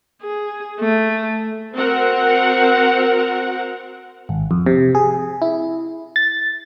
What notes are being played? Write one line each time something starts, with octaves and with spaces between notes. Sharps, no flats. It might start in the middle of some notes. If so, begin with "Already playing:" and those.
G#4
A3
C4 F#4 A#4 F#5
G#1
F2
C3
G#4
E4
A6